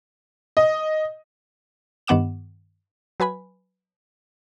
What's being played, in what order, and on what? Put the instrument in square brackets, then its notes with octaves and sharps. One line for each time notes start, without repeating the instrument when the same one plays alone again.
[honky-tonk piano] D#5
[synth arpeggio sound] G2 D#3 B3 F#5 D6 E7
F#3 B4 G#5 B5